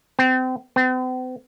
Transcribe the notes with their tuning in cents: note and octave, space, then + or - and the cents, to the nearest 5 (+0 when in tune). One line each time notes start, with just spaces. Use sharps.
C4 -30
C4 -45